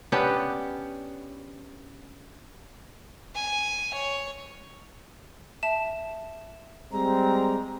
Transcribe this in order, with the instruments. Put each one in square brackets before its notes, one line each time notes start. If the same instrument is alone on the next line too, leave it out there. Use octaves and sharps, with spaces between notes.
[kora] B3 C#4 D4 G4
[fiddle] G#5
C#5
[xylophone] E5 A5 E7
[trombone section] G3 G#3 C4 [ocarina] A#5